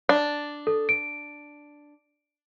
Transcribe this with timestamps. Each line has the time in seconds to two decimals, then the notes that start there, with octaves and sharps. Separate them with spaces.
0.09 D4
0.67 A4
0.89 D7